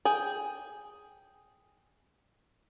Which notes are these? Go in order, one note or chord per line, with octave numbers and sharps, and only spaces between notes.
G#4 G5